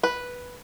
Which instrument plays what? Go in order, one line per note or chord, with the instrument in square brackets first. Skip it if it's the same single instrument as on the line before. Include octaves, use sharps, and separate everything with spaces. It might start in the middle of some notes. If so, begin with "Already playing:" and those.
[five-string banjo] B4